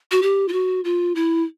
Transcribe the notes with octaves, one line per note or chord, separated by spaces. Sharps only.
F#4
G4
F4
F#4
F4
E4